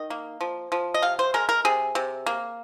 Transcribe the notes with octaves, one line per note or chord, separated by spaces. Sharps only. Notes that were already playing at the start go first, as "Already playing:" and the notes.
Already playing: D#3 D#5
A#3
F3
F3
D#5
C3 F5
C5
G#3 A#4
A#4
C3 G#4
C3
A#3